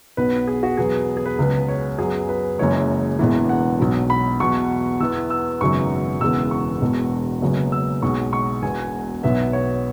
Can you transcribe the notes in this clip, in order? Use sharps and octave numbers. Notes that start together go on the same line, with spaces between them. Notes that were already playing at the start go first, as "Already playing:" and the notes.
B1 B2 B3 B4
G#4
F#4
E2 B2 F#3 B3 G#4
B4
G#4
B4
C#2 C#3 F#3 B3
C#5
F#2 F#3 B3 G#4
B4
F#1 F#2 C#3 E3 G#3 C#5
E1 E2 E3
F#5
B1 B2 F#3
B5
E2 B2 F#3 C#6
E2 E3 B3 E6
E6
G#1 F#2 C#3 F#3 B3 C#6
E1 E2 C#3 E3 B3 E6
C#6
E1 E2 B2
F#1 F#2 C#3 F#3 B3
E6
B1 B2 G#3 C#6
C#6
E1 E2 B2 G#5
B1 B2 F#3 B3 E5
C#5